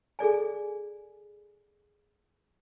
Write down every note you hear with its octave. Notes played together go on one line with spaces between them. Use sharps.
G#4 A4 D5 G#5